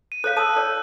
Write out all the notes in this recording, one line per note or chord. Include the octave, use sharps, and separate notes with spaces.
D#7
A4 C#5 F5 F#6
A4 A5 D#6 E6 D#7
A4 C#5 D5